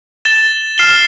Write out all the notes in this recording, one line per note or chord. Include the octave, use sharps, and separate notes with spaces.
A6 E7 G7
F6 C7 E7 G7